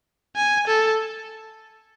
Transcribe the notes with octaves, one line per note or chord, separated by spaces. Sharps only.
G#5
A4